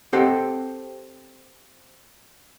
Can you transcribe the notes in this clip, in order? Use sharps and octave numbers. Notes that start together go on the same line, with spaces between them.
C4 G4 A4 C5 D#5 F#5